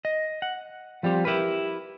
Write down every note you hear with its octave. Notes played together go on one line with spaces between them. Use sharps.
D#5
F#5
F3 G3 C4 G4
E4 G4 A#4 B4